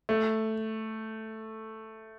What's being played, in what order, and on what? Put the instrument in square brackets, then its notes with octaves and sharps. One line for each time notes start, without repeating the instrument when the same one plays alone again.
[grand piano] A3